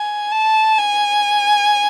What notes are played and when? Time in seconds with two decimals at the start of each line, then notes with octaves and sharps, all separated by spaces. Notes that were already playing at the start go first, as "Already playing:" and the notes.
Already playing: G#5
0.32 A5
0.78 G#5